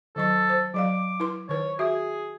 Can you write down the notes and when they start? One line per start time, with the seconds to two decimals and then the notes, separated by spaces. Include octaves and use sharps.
0.16 D#3 F#3 A4 C#6
0.50 C5
0.74 F#3 D5 F5 D6
1.20 E4 B4 C6
1.49 D#3 B4 C#5
1.79 F#4 G#4 E5